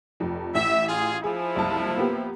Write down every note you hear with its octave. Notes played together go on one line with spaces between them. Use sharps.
F1 F2 F3
A1 E5
F4 G#4
F3 E4 G#4
F#1 C2 A5
A#3 B3 G4